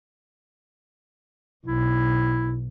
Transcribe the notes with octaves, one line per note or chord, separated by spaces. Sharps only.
B1 E4